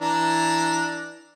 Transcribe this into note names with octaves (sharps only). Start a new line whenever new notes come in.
E3 D4 A#5